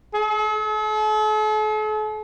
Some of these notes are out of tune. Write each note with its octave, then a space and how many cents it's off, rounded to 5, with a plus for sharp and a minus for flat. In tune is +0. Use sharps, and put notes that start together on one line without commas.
A4 -45